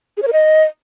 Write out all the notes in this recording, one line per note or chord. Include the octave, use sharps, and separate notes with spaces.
G#4
C#5
A#4
D#5